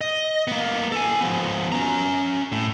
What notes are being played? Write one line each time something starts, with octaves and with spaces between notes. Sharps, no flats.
D#5
A#3 B3
A4 G#5
F3 B3
C#4 A#5
A2